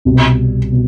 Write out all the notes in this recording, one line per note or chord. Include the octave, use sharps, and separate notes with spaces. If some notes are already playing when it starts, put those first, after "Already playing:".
C2 B2 G3
B2